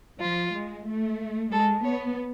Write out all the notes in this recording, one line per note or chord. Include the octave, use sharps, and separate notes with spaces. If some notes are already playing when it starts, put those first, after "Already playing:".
F3 F4
G#3
A3
G#3 A4
B3 C#5